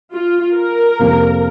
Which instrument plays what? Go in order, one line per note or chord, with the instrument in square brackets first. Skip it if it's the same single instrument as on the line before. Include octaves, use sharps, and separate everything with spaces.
[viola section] F4
A#4
[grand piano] F2 C3 F3 A#3